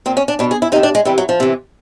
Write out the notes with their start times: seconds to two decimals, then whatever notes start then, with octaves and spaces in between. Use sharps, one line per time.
0.06 A#2 C4
0.17 C#4
0.28 D4
0.39 B2 D4
0.51 G#4
0.62 E4
0.72 C3 D#4
0.76 D#3
0.83 D4
0.95 G#3
1.05 C3 E3 G3
1.18 F#3
1.29 F3
1.40 C3 E3